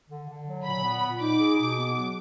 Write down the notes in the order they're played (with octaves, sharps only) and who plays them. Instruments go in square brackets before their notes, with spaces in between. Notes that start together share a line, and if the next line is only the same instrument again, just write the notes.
[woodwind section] D3
D3
F#3
[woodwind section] A#2 [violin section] B5
[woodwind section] B3
A#2
[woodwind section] D#4 [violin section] D6
[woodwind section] G#4
B2
B3
F#3